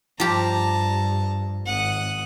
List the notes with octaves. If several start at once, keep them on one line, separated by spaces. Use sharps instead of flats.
G2 F3 G4 A5 A#5
G#1 F#5 D#6